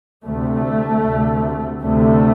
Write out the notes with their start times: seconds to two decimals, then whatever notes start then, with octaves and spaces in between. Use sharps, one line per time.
0.24 D2 C3 A3
1.03 D2 C3
1.82 D2 C3 A3